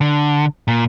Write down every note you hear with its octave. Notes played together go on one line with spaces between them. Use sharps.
D3
A#2